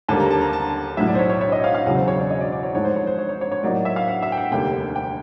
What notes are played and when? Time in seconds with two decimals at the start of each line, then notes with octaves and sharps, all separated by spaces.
0.08 D#2 D3 G3 A#3 A5
0.20 A#5
0.31 A5
0.41 A#5
0.53 A5
0.97 B1 A2 F#3 E5
1.08 D5
1.15 C5
1.19 C#5
1.30 C#5
1.41 C#5
1.52 D#5
1.64 F5
1.74 F5
1.86 E1 E2 C#3 F#3 F#5
1.96 C5
2.08 C#5
2.19 D5
2.31 D#5
2.41 D5
2.52 D5
2.63 C#5
2.74 G#1 G#2 F3 A3 C#5
2.85 C5
2.96 C#5
3.07 C5
3.19 C#5
3.29 C#5
3.41 C#5
3.52 C#5
3.63 A2 F#3 A#3 D#4 D5
3.74 D5
3.85 E5
3.96 F5
4.08 F#5
4.22 E5
4.32 G5
4.37 F#5
4.51 F1 D#2 D3 G3 A#3 G5
4.96 G5